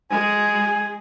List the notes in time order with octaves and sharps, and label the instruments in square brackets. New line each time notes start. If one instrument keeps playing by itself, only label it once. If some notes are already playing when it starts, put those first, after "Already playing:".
[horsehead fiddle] G#3 G#4 [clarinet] G#5